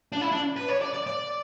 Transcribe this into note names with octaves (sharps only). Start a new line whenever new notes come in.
D4
E4
D4
B4
C#5
D5
D5
D5